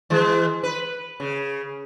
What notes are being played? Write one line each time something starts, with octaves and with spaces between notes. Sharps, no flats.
E3 G#3
B4
C#3